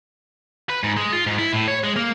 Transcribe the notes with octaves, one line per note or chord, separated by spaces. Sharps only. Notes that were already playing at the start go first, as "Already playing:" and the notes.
B4
G#2
G#3
F4
G#2
E4
A2
C#5
G#3
A#3